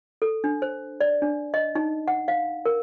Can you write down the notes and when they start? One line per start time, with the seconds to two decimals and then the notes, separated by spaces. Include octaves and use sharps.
0.22 A4
0.44 D4
0.62 C5
1.01 D5
1.22 D4
1.54 D#5
1.75 D#4
2.08 F#5
2.28 F5
2.66 A#4